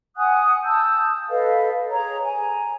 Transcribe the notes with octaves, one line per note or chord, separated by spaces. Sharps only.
F#5 G#5 D#6 F#6
A5 D#6 E6 G6
A4 B4 D#5 F5
G#4 C#5 A#5
G#5 A#5